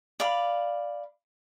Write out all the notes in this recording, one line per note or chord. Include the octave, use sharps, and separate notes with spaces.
D5 F5 B5